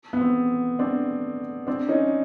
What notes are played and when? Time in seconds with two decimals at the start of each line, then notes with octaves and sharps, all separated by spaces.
0.13 B3
0.21 C4
0.79 C4 D4
1.67 C4 D4
1.89 C#4 D#4